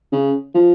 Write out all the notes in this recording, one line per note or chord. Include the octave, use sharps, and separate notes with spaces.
C#3
F3